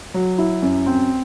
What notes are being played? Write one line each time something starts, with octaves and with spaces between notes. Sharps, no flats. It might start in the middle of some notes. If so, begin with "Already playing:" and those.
F#3
E4
F#2
C4